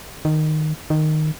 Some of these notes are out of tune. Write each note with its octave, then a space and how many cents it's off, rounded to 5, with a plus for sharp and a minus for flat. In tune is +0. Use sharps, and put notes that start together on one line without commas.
D#3 -10
D#3 -10